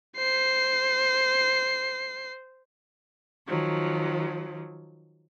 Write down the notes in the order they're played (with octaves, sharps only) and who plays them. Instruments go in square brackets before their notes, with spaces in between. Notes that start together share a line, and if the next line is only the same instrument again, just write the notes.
[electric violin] C5 C7
[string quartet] D#3 F3 F#3